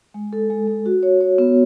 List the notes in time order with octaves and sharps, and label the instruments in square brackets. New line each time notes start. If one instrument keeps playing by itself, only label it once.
[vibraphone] G#3
A4
G#3
G#3
F#4
C#5
C#5
B3